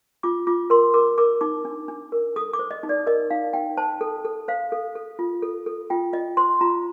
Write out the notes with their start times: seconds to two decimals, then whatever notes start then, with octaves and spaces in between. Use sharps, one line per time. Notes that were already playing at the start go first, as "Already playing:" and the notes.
0.23 F4 D6
0.47 F4 D6
0.70 A#4 C6
0.94 A#4 D6
1.18 A#4 D6
1.41 D#4 D6
1.65 D4
1.88 D4
2.12 A#4
2.36 A4 D#6
2.53 D6
2.59 C5
2.71 D#5
2.83 D#4
2.89 D5
3.06 A#4 D#5
3.30 D#4 F5
3.53 D#4 G5
3.77 C5 A5
4.01 A4
4.25 A4
4.48 C5 F5
4.72 A4
4.96 A4
5.19 F4
5.43 A4
5.66 A4
5.90 F4 G5
6.13 F4 D#5
6.37 C5 C6
6.61 F4 A#5